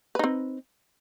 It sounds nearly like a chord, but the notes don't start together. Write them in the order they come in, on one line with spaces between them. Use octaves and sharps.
B4 D#4 C4